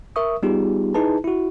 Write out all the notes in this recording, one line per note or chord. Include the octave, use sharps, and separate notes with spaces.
A#4 E5 C#6 D#6
G3 B3 D#4 F4 G4 G#4
D#4 E4 G#4 B4 A5
E4 F#4